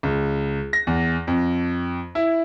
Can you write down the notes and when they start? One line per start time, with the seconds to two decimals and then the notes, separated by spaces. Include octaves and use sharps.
0.03 C#2
0.73 A#6
0.87 E2
1.27 F2
2.15 E4